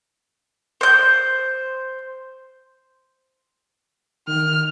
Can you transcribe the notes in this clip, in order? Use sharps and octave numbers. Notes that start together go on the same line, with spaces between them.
C5 G6
D#3 F6